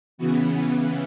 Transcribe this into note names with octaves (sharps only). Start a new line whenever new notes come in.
C#3 E3 B3 F#4